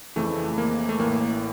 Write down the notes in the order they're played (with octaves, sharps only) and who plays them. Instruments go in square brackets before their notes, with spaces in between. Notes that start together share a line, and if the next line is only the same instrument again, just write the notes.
[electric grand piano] F2 C#3 E3 A3
A#3
A3
A1 A2 E3 A#3